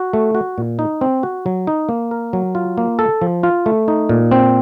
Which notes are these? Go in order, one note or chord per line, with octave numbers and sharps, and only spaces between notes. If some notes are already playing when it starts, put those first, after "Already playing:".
Already playing: F#4
A3
F#4
A#2
D#4
C4
F#4
F#3
D#4
A#3
A#4
F#3
F4
A#3
A4
F3
F4
A3
D#4
A#2
C4